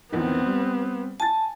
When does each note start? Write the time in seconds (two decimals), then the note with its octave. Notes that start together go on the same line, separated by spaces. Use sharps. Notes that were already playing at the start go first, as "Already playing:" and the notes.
0.12 A#1 E2 D#3 B3 C4
0.46 G3
1.20 G#5 A5 A6